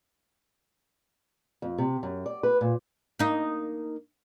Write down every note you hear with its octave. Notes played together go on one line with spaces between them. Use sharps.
F2
C3
F#2
D5
B4
A#2
A#3 D#4